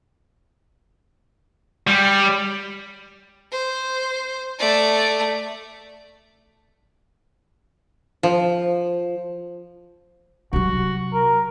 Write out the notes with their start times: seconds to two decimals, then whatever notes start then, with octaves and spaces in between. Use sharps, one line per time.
1.87 G3
3.52 C5
4.59 A3 D5
8.23 F3
10.53 C3 F#3 F#4
11.14 A#4